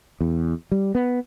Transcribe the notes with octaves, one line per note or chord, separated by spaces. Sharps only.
E2
G3
B3